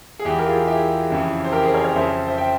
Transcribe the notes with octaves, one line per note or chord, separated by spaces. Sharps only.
G#4
E2 E3 E4 G4
A#4
F4 G#4
E4 G4
F2 C#3 E3
C5
G4 A#4
G#4 C5
A#4 C#5
A#4 C#5
F2 C#3 F3 C5 E5
C5 E5
E5 G5